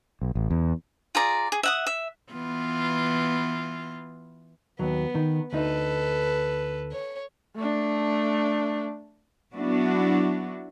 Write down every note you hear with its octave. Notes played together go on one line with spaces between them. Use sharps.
B1
A1
E2
F4 G#4 D5 A#5
G#4
E5 F#5 D#6
E5
E3 B3 F4
D#2 F#3 B3
D#3
D2 D#4 A4 B4
C#5
A3 D4
F#3 B3 D4 E4 F#4